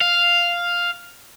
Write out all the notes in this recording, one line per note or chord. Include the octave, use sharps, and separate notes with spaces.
F5